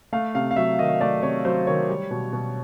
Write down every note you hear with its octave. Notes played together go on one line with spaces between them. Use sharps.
A3 F5
C3 F5
F5
F#3 E5
D#3 D#5
A3 D5
C3 C#5
F#3 C5
D#3 C#5
G3
B2
B2